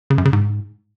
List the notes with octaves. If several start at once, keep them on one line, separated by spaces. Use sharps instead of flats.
C#3
F#2
C#3
G#2